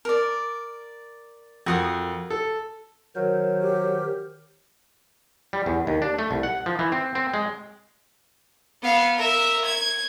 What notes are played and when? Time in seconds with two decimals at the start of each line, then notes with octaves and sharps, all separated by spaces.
0.05 A#4 D5
1.66 F2 F#4 A#4 D#6
2.30 A4
3.16 D#3 F#3 A#4 C5
3.61 G4
5.53 G3
5.66 E2
5.87 D#2
6.02 D4
6.19 A3
6.31 C2
6.43 F#5
6.66 F3
6.79 E3
6.92 C4
7.15 C4
7.34 G#3
8.83 B3 F5
9.17 A#4 E5
9.65 G#6